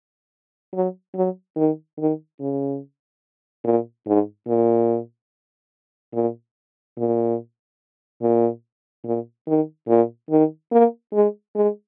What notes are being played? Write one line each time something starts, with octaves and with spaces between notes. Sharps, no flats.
F#3
F#3
D#3
D#3
C#3
A#2
G#2
A#2
A#2
A#2
A#2
A#2
D#3
A#2
D#3
A#3
G#3
G#3